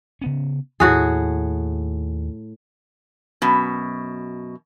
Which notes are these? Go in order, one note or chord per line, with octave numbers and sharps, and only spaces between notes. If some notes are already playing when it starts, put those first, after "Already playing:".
C#3 B3 C#4
D#2 A2 F#4 G#4
F#2 B2